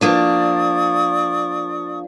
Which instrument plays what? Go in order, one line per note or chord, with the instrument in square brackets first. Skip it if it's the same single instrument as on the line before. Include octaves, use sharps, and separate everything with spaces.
[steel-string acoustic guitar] F3 A#3 D4 [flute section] D5 C#6 D#6